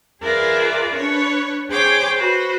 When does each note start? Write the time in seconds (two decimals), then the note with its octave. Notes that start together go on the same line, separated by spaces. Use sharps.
0.23 F4 G#4 A#4 B4 D5 E5
0.95 D4 B4 C#5
1.69 G#4 C5 C#5 G5 D6
2.18 F#4 B4 C5